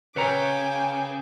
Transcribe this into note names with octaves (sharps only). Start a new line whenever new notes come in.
C#3 B4 C#5 G5 G#5 A#5 D6